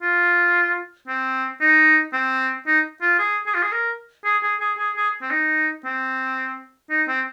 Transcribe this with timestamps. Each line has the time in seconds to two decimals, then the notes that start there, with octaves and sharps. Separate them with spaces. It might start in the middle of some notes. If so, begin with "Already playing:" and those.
0.02 F4
1.07 C4
1.61 D#4
2.13 C4
2.67 D#4
3.02 F4
3.19 G#4
3.46 G#4
3.54 F4
3.62 G#4
3.72 A#4
4.25 G#4
4.43 G#4
4.60 G#4
4.78 G#4
4.96 G#4
5.22 C4
5.31 D#4
5.85 C4
6.90 D#4
7.08 C4